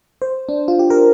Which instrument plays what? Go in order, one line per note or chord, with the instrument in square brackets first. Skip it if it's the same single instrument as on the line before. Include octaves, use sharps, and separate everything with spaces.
[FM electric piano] C5
D4
F4
G4
A#4